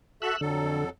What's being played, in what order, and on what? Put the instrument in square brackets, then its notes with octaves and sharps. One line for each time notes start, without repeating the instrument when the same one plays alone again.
[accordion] F#4 A4 E5 [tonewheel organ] E6 F#6
[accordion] F2 F#3 A4 [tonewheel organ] D3